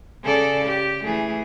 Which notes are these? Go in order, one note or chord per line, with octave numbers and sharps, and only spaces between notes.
C#3 A4 D5
G4
E3 A3 G#4